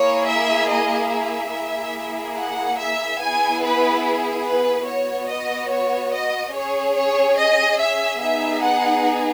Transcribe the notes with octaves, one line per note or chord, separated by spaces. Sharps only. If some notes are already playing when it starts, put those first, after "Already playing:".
Already playing: A#3 E4 G#4 C#5
E5
D#5
E5
A#3 E4 G#4
F#5
E5
B3 E4 G#4 G#5
B4
B4
B3 F#4 C#5
D#5
C#5
D#5
C#4 G#4 C#5
C#5
D#5
E5
B3 D#4 G#4 E5
F#5